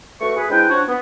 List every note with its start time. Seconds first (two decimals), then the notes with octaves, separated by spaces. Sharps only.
0.21 D2 A3 F#4 B4 E5 C#6
0.36 G#4 B4
0.50 G#3 C4 D4 E4 B4 G5
0.69 F3 D4 F#4 C#5
0.87 B3